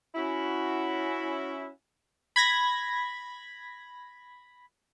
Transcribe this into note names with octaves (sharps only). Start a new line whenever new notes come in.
C#4 E4 F#4
B5 G#6 A#6